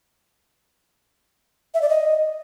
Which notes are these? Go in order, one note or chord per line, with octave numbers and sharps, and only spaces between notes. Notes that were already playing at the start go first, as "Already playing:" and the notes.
E5
D5
D#5